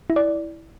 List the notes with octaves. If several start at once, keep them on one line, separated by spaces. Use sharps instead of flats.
E4
D5